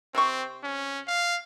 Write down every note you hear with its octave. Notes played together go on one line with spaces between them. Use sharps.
C3 C4 C#6
C#4
F5